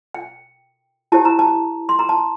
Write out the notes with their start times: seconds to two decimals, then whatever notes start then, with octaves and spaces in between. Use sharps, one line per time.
0.14 G5
1.12 E4 G4 C5 A5
1.25 A#5
1.39 A5
1.89 C6
1.99 A#5
2.09 A5